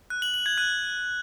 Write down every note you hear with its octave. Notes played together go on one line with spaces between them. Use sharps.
F#6
F#7
F#7
G#6
F#6